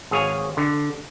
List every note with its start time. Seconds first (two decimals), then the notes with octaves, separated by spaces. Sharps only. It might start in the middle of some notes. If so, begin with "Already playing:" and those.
0.11 G#1 G#4 C#5 F5 G#5
0.57 D3